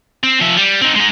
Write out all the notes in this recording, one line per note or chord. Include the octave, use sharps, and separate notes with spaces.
C4
F3 E5
G3
C4 D#4
G#3 D#4